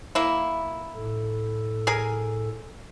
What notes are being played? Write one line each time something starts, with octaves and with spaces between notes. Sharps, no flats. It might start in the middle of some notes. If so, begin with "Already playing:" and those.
A#3 E4
A2 A4
G#4 A#4 G#5